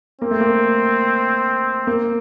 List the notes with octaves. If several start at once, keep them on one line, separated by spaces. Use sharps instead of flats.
A#3 C4
A3
A#3
A#3